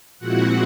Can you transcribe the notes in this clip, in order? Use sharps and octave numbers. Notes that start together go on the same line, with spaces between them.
A#2 F3 G#3 C4 E4 F#4 F#5